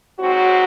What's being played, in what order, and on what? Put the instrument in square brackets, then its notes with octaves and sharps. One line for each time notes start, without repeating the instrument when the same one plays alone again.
[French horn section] G#2 F#3 C4 F#4